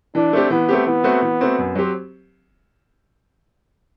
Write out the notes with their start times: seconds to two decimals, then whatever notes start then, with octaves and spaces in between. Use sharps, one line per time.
0.15 E3 D4
0.33 A3 C4 G4
0.50 E3 B3
0.69 A3 C4 G4
0.87 E3 B3
1.04 A3 C4 F#4
1.22 E3
1.41 A3 C4 F#4
1.59 F#2
1.75 F#3 C4 G4 C5